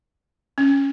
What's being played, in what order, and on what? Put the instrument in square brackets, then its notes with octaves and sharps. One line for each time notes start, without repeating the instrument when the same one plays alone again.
[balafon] C#4